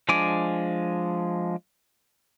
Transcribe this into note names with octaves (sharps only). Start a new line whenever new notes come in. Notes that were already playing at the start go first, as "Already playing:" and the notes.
F3 G#3 D4 G#5 D6